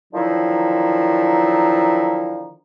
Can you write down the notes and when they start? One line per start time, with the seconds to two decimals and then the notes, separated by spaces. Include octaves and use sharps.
0.13 D3 D#3 F3 F#3 D#4 E4